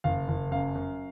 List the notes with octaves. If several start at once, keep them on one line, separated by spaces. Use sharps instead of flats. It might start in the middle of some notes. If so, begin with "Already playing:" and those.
F#1 F5
F#1
F#2 F5
F#2